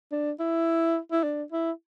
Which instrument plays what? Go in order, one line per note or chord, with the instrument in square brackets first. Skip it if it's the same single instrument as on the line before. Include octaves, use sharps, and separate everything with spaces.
[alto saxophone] D4
E4
E4
D4
E4